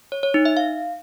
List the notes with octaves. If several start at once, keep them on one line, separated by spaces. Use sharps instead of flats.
C#5
C#5
D#4
E5
F5